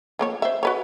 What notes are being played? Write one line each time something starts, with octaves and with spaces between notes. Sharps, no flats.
F3 A#3 C#5
C5 E5
F#4 B4 C#5